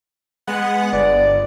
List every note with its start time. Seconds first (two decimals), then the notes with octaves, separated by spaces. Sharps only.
0.47 G#3 B3 F#5
0.93 G1 D5